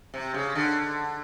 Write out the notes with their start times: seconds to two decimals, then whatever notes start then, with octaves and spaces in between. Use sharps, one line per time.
0.14 C3
0.34 C#3
0.55 D3